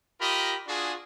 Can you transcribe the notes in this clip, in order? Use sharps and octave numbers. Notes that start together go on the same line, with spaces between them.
F4 G4 A#4 D#5 B5
D4 F4 F#4 G#4